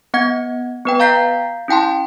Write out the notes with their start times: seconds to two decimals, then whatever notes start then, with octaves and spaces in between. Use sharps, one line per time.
0.14 B3 F#5 G#6
0.85 B3 B4 G5
1.00 F5 A#5 G6 B6 C7
1.68 C#4 E4 G5 A5 C6